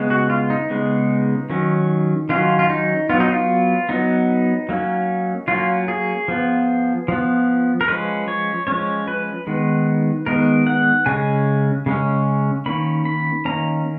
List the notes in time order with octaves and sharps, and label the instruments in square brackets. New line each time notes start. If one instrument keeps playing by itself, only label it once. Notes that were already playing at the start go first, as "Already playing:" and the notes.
Already playing: [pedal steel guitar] C#3 G#3 B3
F#4
F4
D#4
C#3 G#3 B3
D#3 F#3 C#4
D#3 F#3 C#4 F4
F4
D#4
F#3 B3 F4
D#4
F4
F#3 B3 D#4
F#3 A#3 C#4
F#3 A#3 C#4 F4
G#4
F3 B3
F3 B3
A#4
F3 G#3 C#4 B4
C#5
F3 G#3 C#4 C#5
B4
D#3 G#3 B3
D#3 G#3 B3 A#4
F#5
C#3 G#3 C#4 G#5
C#3 G#3 C#4
D#3 A#3 C#4 B5
B5
D#3 A#3 C#4 A#5